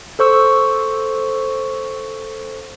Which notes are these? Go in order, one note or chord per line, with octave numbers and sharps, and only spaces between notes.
A4 C5 C#6 E6